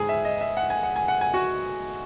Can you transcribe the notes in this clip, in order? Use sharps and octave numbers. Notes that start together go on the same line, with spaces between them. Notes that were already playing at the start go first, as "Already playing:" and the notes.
Already playing: G#2 G#4 G#5
E5
D#5
E5
F#5
G#5
F#5
G#5
F#5
G#5
F#4 F#5